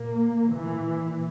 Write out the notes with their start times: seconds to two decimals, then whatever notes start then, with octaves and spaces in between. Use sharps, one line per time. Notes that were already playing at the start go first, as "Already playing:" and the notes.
Already playing: A#2 A#3
0.49 A#2 E3